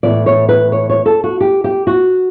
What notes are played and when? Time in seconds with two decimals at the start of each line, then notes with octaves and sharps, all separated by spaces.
0.03 A2 E3 B3 D5
0.26 C#5
0.49 B4
0.72 C#5
0.90 C#5
1.06 A4
1.24 F#4
1.41 G4
1.64 G4
1.87 F#4